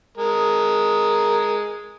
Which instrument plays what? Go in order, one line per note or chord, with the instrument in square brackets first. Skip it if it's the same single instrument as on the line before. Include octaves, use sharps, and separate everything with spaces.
[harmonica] G#3 A#4